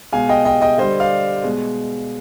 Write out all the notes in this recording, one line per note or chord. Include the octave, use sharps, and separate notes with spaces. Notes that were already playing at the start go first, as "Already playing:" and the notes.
B2 G#3 F5 G#5
D#5 G5
D#5 G5
D#5 G5
D3 G3 C5 D#5
D5 F5
B2 G#3